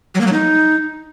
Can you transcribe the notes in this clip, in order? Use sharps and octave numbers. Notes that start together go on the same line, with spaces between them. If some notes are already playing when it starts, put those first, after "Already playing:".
F#3
A#3
F#3
D#4